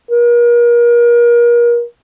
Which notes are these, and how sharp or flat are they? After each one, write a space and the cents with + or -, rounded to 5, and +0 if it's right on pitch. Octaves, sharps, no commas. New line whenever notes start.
A#4 +35